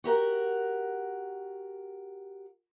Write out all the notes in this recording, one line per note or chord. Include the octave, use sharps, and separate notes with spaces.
F#4 G4 A#4 F#5